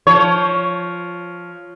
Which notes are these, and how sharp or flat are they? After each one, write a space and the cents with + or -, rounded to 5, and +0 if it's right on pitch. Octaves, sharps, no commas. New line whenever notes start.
F3 +0 C#5 +5